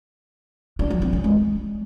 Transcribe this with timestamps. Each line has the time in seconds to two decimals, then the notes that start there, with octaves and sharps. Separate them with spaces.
0.79 D4
0.90 F#3
1.02 C4
1.13 C#4
1.24 G#3